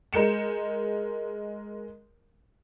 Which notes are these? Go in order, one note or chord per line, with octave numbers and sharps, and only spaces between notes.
G#3 A#4 G6 C#7 E7